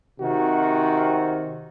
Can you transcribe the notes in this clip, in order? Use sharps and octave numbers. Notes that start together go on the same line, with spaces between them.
C3 D#3 C4 F#4